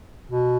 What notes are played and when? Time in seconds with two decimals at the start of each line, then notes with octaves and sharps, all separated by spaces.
0.31 B2